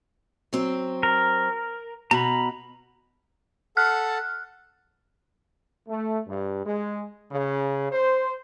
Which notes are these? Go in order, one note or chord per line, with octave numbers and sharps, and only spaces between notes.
F#3 C4
A#4
B2 A#5 B5
A4 F#5 A5 F6 F#6
A3
G2
G#3
C#3
C5